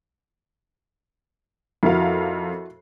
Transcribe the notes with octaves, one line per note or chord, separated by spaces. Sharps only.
F2 E4 F#4 A#4 F5